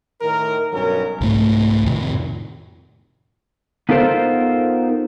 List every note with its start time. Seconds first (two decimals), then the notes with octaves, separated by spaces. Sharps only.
0.21 A2 D#3 A#4
0.73 B1 G2 F#3 C#4 A#4
1.21 C2 G#2 A3
1.85 F2 A2 C3 D#3
3.89 B3 D#4 F4 A4 A#4 C5